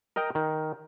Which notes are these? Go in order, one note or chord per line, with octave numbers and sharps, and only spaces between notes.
A#4 D#5 G5 A#5
D#3